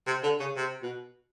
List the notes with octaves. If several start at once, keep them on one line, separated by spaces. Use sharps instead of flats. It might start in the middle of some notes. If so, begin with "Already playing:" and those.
C3
D3
C#3
C3
B2